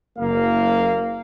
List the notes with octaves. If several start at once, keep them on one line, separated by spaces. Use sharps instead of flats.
F#1 A#3 F5